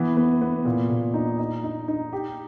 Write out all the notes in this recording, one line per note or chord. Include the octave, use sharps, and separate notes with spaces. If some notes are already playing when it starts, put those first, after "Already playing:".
Already playing: E3 B3
B3
B3
A#2
A#2
D#4
D#4
D#4
D#4
G4